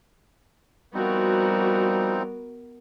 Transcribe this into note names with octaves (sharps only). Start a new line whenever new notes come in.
F3 G3 B3 C4 D#4 F#4 A#4